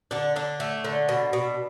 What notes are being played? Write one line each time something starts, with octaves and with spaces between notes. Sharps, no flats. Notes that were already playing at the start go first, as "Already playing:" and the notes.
D3 D4
D3 D4
A3
D3
B2
B2